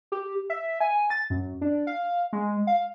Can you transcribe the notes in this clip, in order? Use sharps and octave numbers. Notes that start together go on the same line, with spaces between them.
G4
E5
G#5
A6
F#2
D4
F5
G#3
F5